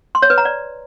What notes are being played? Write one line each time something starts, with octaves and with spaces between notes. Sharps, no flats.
C6
C#5
B4
A#5
D5